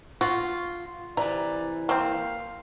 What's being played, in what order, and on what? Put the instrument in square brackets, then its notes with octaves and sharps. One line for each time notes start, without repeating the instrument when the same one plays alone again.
[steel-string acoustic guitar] F4 [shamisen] F#4
[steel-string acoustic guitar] C3 E3 [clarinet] D5 [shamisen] A#5
[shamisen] A#3 C4 [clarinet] F5